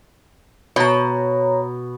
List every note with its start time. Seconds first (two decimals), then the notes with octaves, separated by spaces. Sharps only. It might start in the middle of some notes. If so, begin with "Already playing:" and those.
0.76 B2 C#5 A#5